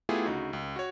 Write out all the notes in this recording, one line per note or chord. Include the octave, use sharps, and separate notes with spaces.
A3 B3 E4 F4 G4 G#4
D2 C#3 D#4 F#4
C#2
F#4 C#5